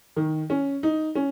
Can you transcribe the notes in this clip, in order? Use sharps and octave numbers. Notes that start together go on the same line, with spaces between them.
D#3
C#4
D#4
C#4